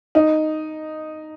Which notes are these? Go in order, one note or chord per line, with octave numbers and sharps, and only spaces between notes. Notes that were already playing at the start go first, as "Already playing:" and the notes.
D#4